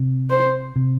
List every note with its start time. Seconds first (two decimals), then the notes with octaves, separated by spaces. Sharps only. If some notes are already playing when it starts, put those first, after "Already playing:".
Already playing: C3
0.30 C5
0.76 C3